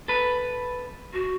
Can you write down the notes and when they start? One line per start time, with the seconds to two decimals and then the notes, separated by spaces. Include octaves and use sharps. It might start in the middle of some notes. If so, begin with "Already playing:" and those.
0.08 A4 B4
1.13 F#4